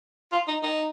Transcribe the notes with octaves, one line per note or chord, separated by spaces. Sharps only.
F4
D#4
D#4